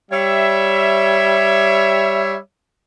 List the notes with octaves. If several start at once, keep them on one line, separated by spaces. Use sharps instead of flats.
G3 C#5 E5